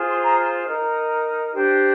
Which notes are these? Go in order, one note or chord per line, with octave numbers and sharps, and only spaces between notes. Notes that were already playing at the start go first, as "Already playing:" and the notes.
Already playing: F4 G#4 C5
C6
A#5
D#4 A#4
D4 G4 C5